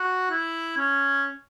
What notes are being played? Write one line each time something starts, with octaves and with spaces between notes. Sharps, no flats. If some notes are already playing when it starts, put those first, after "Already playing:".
Already playing: F#4
E4
C#4